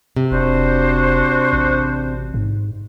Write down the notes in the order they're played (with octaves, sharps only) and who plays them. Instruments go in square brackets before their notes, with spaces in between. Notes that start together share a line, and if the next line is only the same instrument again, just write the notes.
[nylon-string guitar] C3
[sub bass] F1 [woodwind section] D4 F#4 C5
[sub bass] A1
G#2